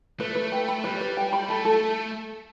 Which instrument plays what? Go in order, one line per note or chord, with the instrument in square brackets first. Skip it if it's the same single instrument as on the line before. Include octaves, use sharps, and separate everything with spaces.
[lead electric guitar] A3 [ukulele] B4
[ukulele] B4
G5
B5
[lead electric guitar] G3 [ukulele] B4
[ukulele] B4
G5
B5
[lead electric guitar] A3 [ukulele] A4
[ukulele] A4